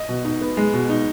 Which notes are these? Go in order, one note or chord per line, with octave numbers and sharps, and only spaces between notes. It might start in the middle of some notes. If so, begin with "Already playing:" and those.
Already playing: D#5
B2
D#4
B3
G#3
B2
D#4